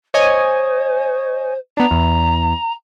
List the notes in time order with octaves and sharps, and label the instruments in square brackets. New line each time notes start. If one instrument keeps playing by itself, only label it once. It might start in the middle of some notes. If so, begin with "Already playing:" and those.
[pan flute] C5 [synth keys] C#5 D#5 G#5
[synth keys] B3 D4 [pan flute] A#5
[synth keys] E2